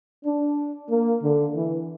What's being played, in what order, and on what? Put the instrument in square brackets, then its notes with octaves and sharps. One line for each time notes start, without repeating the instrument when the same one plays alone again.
[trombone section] D4
A#3
D3
E3